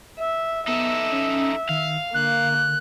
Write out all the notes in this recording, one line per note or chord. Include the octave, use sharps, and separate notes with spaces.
E5
B3 D#4 A4 E5
C#4
D#3 F5
D3 A#3 F#6